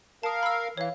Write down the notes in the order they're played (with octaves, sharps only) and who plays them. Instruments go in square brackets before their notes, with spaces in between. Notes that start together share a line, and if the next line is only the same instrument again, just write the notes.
[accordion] A#4 F5 [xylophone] A5 D#6
[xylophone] B5 E6
[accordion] E3 [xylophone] C#5 F5